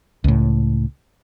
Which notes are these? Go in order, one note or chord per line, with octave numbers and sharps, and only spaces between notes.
C#2 A2